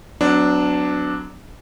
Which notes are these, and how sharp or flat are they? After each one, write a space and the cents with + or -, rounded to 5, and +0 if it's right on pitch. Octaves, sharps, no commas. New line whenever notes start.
F#3 +0 B3 +45 D4 +0